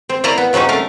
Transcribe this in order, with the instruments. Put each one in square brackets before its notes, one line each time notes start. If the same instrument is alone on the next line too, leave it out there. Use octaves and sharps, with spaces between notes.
[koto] C4
A#3 E4 C5 D5 D#5 A#5
B3
C#3 F#3 C4 C#4 D#4
A3 A#4 F5